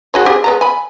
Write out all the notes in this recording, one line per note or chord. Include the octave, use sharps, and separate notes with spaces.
F#4 G#4 C#5
C4 G4 G#4
G#3 B3 A#5
G#5 B5